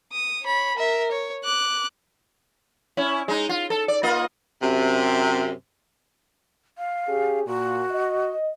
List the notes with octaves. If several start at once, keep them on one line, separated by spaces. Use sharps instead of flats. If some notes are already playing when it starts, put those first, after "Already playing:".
D#6
C#5 B5
A#4 E5
C#5
D6 F#6
C#4 E4
G#3 D#4
F4
A4
D5
A#3 F4 D#5
F#2 C3
F5
C#4 G4 G#4
A#2 F#4
D#5